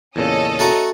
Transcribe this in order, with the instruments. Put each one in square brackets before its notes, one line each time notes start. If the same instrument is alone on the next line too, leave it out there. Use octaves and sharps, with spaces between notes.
[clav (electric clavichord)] E2 A#2 C#3 [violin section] C#4 A4 D#5
[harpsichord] A3 F#4 A#5